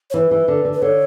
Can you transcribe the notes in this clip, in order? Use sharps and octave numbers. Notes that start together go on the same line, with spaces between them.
C#5
E3 B4
E3
D3
D3
B4
D3 C#5